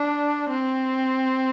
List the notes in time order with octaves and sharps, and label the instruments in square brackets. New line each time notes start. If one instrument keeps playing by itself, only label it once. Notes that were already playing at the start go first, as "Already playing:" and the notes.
Already playing: [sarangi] D4
C4